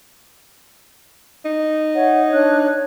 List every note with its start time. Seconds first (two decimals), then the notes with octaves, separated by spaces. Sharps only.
1.45 D#4
1.95 C#5 E5 F#5
2.33 D4 C#5 F#6